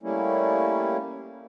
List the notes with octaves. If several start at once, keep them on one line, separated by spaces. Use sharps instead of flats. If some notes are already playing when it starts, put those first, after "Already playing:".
G3 A3 A#3 C#4 E4